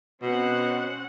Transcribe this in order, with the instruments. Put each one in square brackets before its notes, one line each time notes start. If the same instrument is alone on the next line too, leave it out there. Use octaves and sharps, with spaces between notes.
[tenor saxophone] B2 [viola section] C4 C#4 F#5